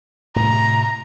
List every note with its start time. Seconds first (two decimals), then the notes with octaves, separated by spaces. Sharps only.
0.36 A2 C3 A3 A#5